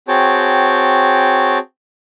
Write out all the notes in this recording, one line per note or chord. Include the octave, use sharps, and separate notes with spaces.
C4 F#4 G#4 C#5 G5 A5